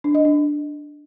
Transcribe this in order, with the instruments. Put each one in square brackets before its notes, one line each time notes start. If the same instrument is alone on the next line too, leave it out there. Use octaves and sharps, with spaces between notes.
[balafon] D4
D#5
D4